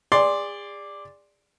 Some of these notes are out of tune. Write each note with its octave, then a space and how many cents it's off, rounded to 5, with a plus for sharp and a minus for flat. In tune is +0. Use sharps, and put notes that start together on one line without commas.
G#4 -35 D5 +0 C6 +0